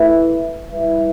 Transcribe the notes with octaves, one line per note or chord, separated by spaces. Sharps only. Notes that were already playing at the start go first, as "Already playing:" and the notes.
Already playing: A3 E4 B4 E5
G3 E4 B4 E5